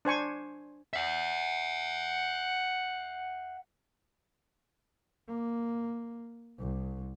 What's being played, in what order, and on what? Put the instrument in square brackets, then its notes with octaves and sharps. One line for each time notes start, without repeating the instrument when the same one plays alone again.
[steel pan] D4 C5 G#5 C#6
[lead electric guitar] E5 F#5
[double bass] A#3
C2